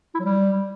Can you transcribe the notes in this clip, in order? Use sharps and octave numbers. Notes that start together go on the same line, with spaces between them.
E4
F#3
G3